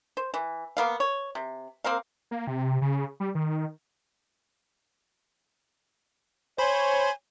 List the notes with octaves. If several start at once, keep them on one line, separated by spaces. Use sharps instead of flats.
C5
E3
A#3 B3 F5
C#5
C3
A#3 C4 A#4 F5
A#3
C3
C#3
G3
D#3
C5 C#5 G#5 B5 C6